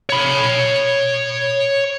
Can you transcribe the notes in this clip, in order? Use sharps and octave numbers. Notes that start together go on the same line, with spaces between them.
C#5 B5